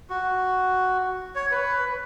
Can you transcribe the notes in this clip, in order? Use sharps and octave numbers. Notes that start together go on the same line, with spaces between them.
F#4
C#5
B4